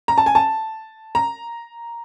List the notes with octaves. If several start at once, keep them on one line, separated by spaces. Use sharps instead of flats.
A#5
A5
G#5
A5
A#5